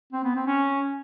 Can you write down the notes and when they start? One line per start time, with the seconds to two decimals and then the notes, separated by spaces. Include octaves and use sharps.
0.13 C4
0.24 B3
0.36 C4
0.47 C#4